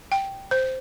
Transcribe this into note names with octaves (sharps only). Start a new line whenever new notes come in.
G5
C5